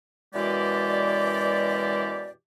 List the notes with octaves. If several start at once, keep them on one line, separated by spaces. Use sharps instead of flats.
F#2 B2 E3 G#3 G4 D5